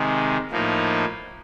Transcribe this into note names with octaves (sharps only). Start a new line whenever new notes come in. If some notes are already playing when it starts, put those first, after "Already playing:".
Already playing: C3 D#3 G#3
A2 F3 A#3 D#4